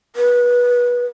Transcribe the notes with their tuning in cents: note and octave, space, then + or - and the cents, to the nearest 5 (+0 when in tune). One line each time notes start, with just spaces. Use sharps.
B4 -25